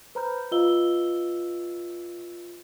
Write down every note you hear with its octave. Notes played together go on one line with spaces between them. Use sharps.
B4 C5 A#5 B5 F6 G6
F4 B4 D#5 F5 E6 G7